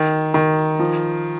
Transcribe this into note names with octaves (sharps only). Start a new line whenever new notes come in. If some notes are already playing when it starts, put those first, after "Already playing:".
Already playing: D#3
D#3
F3